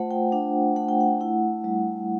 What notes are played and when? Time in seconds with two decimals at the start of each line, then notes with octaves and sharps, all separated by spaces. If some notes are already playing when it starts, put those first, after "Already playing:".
Already playing: A3 F4 C5 F#5
0.11 G5
0.32 D4 F#5
0.76 A3 F#5
0.89 G5
1.01 F#5
1.21 E4 F#5
1.64 G3